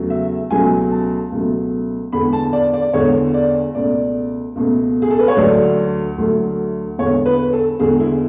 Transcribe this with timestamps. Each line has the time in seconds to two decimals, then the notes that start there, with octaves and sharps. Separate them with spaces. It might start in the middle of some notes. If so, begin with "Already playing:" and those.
Already playing: E2 C#3 F#3 A3
0.10 E5
0.50 C#2 B2 F#3 A3 G#5
0.91 A5
1.32 C#2 B2 F#3 A3
2.12 E2 D3 G#3 B5
2.33 A5
2.53 D5
2.74 D5
2.93 E2 D3 G#3 C#5
3.34 D5
3.75 C#2 B2 A3 D5
4.55 C#2 B2 A3
5.02 G#4
5.11 A4
5.19 B4
5.28 C#5
5.37 D2 D3 F#3 A3 D5
6.18 D2 D3 F#3 A3
6.98 E2 D3 G#3 C#5
7.26 B4
7.53 A4
7.80 E2 D3 G#3 G#4
8.00 E4